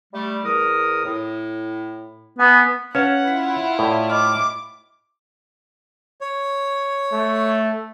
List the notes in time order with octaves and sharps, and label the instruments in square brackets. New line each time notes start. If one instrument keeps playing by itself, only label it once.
[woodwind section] G3 A3
E2 A#4 D#6
A2
[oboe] B3 [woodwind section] F#5 G#5
[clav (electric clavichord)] C#4 C#5 A5 [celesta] B4 F5 [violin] F#5
[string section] E4 F4 [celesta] B6
[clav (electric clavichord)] A2 [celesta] A4 D5
[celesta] D#5 B5 F6 [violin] D6
[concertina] C#5
[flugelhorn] A3